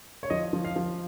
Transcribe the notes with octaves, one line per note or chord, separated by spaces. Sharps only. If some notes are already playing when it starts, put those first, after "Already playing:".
C#5
F3 D#5
F3
F5
F3